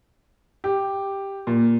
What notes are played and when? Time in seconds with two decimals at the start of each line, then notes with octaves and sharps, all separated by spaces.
0.64 G4
1.47 A#2